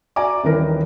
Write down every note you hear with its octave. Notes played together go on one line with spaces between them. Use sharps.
F#4 D5 G#5 A#5 D6
D#1 D#3 E3 A#4